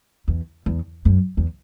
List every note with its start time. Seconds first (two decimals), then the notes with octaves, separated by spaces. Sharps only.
0.28 E2
0.66 E2
1.05 F#2
1.37 E2